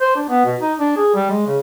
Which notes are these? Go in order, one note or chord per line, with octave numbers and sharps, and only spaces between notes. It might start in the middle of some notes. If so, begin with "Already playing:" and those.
C5
D4
B3
B2
D#4
D4
G#4
G3
G#3
C#3